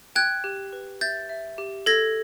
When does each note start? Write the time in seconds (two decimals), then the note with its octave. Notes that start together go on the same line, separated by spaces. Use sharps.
0.16 G5 F#6 G#6
0.44 G4
0.73 B4
1.01 E5 G6 A6
1.29 E5
1.58 G4
1.86 A4 G#6 A#6